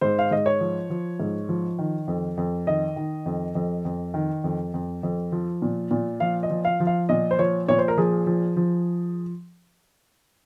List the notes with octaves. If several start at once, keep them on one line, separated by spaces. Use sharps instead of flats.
G#2 C5
F5
G#2 D#5
C#5
F3
F3
G#2
F3
D#3
F2
F2
D#3 D#5
D#3
F2
F2
F2
D#3
F2
F2
F2
F3
A#2
A#2
F3 F5
D#5
F3
F5
F3
F5
A#2 D#5
C5
F3 C#5
A#2 C#5
C5
A#4
F3 G#4
F3
F3